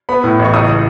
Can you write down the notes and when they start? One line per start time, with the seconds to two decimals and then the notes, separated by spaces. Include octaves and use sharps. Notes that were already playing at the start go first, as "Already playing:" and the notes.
0.09 B3 B5
0.23 A2
0.39 A1
0.45 C#6
0.54 C#2 D#6